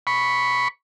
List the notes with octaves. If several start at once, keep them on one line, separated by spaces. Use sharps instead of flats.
B5 C#6